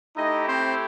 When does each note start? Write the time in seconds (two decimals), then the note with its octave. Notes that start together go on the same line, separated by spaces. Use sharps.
0.16 A3 D#4 E4 G4 D#5
0.48 C4 C5